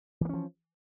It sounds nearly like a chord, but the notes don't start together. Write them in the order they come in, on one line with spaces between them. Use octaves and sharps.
E3 A#3 C#4 F3